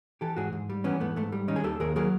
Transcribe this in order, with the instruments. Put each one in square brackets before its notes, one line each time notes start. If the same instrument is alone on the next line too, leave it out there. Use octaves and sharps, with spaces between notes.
[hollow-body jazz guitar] E3 G4 A4
G#2 F#4 G#4
G#2
G3
E3 B3 C#4
G#2 A3 B3
G#2 A3
G3
D#3 C#4 D#4
G#4
D#2 G4 A4
D#2 G#4 A#4
F#3 G#4 A#4